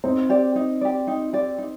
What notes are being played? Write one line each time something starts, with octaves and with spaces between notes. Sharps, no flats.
C4 D#4
G4 D5
D#4
G4 D5
D#4
G4 D5
D#4